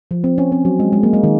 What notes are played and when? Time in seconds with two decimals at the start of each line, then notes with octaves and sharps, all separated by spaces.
0.11 F3
0.24 C4
0.38 C#4
0.52 C4
0.65 F#3
0.79 G#3
0.93 G#3
1.03 A#3
1.14 G#3
1.24 D#3